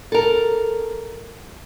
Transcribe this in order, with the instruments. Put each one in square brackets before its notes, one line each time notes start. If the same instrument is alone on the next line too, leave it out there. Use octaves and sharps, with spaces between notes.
[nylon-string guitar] A4 A#4